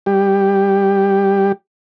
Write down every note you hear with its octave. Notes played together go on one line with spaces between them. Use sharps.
G3 G4